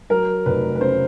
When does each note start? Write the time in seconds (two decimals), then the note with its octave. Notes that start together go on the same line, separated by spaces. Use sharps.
0.10 F#3 A#4
0.46 F1 B4
0.75 B4
0.80 C#3 C5